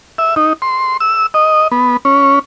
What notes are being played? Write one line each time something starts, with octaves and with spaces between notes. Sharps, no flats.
E5
D#4
C6
E6
D#5
B3
C#4